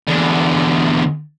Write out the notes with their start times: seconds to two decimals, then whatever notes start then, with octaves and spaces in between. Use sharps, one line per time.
0.08 E2 D3